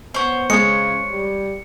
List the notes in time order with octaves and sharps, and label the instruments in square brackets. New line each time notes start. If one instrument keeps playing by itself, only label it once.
[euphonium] B3 [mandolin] C5 C#5
[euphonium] C#3 [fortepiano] G#3 D#6 [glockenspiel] C#7
[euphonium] G3